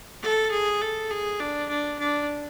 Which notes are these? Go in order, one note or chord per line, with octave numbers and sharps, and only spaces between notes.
A4
G#4
A4
G#4
D4
D4
D4